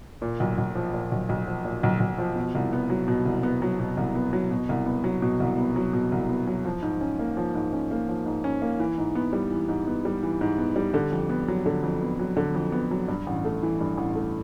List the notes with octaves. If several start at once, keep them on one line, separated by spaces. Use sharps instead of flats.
A#2
B1
B1
F3
A#2
B1
B1
F3
A#2
B1
B1
F3
B2
C2
B3
F#3
B2
C2
B3
F#3
B2
C2
B3
F#3
B2
C2
B3
F#3
B2
C2
B3
F#3
B2
C2
B3
F#3
F3
G#2
C#4
A#3
F3
G#2
C#4
A#3
F3
G#2
C#4
A#3
E3
G#2
B3
G3
E3
G#2
B3
G3
E3
G#2
B3
G3
D3
F2
B3
F#3
D3
F2
B3
F#3
D3
F2
B3
F#3
G2
A1
A3
E3
G2
A1
A3